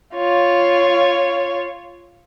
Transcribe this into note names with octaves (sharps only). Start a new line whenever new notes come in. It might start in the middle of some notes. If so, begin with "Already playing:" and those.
F4 C#5